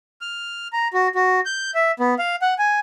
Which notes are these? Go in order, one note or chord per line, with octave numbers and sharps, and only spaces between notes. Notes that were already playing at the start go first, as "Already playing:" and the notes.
F6
A#5
F#4
F#4
G6
E5
B3
F5
F#5
G#5